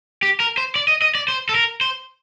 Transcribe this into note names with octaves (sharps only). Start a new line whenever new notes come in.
G4
A#4
C5
D5
D#5
D#5
D5
C5
A4
A#4
C5